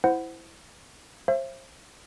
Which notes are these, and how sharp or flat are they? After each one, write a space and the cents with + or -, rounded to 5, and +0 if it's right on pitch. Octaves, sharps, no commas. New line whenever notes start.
E4 +0 C5 -15 F#5 +0
C5 +35 E5 +35